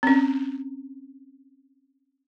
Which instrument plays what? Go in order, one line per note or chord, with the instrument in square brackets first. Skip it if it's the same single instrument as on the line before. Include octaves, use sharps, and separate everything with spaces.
[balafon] C4 C#4